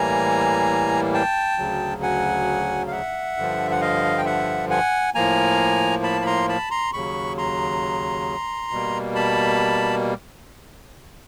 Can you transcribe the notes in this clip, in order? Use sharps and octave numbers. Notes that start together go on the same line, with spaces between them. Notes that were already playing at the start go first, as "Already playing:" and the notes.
Already playing: A2 E3 G3 A#3 G#5 A#5
G5 A5
D2 C#3 F#3
F#5 G#5
F5
E5 F#5
G2 D3 F3
F#5
D#5 F5
G5
E5 F#5
F#5 G#5
A2 F3 A#3 G#5 A#5
A5 B5
B5
A#5 C6
A5 B5
A#5 C6
D#2 C#3 F#3 B5 C#6
A#5 C6
B2 G3 A#3
A5 B5